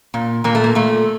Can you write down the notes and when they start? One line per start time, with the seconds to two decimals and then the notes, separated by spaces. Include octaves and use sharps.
0.14 A#2
0.44 A#2 A#3
0.55 A3
0.64 A#3
0.75 A#2 A3